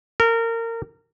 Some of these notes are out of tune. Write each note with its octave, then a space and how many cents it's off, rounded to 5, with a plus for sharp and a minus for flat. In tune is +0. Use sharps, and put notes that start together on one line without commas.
A#4 -25